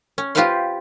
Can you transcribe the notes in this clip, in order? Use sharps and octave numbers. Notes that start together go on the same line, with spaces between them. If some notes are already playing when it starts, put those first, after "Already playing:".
C#4
F4 G4 B4 C5 F5 C6